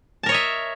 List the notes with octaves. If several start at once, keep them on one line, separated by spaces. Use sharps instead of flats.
A#4 C#5 D#5 E5 A5